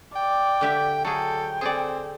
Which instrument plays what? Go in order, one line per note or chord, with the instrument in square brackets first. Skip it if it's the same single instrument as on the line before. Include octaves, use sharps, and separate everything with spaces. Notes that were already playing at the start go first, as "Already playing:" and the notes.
[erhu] D5 [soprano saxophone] G5
[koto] D3 G4 E5
[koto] F#3 G#4 [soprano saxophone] A4 [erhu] G5
[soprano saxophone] C4 [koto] G#4 A4 D5